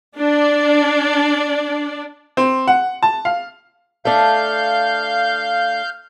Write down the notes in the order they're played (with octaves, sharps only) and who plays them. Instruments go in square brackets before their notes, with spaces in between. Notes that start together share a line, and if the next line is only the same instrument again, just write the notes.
[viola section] D4 D5
[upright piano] C4
F#5
A5
F5
[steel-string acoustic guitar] A3 D4 [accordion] F5 G6